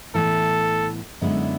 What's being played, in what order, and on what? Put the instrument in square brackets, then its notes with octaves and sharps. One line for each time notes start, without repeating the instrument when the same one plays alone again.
[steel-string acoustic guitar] A2 E3 B3 [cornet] A4
[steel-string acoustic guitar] F#2 D3 G#3 B3 E4